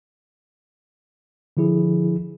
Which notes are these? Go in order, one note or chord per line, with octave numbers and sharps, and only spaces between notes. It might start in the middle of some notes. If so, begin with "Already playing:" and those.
D3 F3 E4 G#4